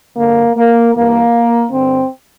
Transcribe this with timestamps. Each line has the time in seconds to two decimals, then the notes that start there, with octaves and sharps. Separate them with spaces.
0.16 G2 D3 A#3
0.56 A#3
0.94 G2 E3 A#3
1.72 G2 D3 C4